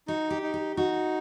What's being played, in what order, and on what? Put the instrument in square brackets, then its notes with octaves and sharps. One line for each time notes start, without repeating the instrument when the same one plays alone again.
[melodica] D#4 [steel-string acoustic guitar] F#4
[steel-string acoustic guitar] G4
[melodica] D#4
[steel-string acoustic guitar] G4
[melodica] D#4 [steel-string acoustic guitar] F#4